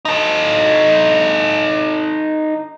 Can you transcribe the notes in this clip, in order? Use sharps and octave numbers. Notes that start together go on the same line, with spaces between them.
D#4 A4